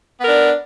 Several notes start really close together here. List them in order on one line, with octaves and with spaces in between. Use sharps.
B3 A#4 D4